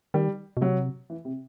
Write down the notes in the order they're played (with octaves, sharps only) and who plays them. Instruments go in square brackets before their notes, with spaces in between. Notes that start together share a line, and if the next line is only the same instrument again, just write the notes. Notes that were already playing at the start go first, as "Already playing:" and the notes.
[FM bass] D#3 [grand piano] G3
[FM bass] B2
[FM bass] C3 [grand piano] F#3
[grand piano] E3
C3